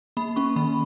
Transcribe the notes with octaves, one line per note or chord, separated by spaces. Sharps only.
A#3 B5
C#4 C#6
D#3 B5